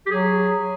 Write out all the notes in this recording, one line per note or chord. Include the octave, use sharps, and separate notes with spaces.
G4
F#3 G#4